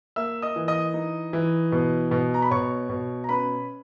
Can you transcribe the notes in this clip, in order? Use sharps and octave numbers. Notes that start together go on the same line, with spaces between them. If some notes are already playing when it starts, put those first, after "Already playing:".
A#3 E5 E6
D#5 D#6
E3
D#5 D#6
D#4
E3
B2
B2
A#5
B5
B2 C#5 C#6
B2
A#5
C#4 B4 B5